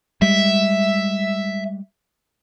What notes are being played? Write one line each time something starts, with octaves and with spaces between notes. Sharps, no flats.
G3 G#3 E5